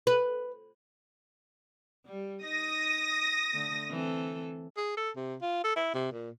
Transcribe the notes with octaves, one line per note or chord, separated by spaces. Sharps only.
B4
G3
D#4 D#6 A#6
D3 A3
E3 C4 A4
G#4
A4
C3
F4
A4
E4
C3
A#2